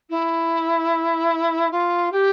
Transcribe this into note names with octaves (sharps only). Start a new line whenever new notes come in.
E4
F4
G4